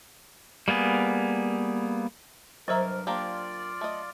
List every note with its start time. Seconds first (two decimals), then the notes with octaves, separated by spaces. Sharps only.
0.68 G3 A#3 B3 G#4
2.68 G2 C3 F#3 A#4 C5 D#5 E5 A#5
3.07 A#3 D4 F4 G4 D5
3.81 A3 D#5